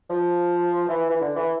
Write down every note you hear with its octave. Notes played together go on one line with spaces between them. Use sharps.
F3
E3
E3
D3
E3